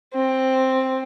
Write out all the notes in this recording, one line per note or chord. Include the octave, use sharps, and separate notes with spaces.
C4